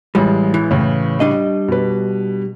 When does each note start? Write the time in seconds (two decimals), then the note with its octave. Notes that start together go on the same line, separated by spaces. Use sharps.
0.15 A1 G3 G#3
0.54 E3
0.71 A2 C#3
1.20 G3 D4 D#5
1.68 B2 B4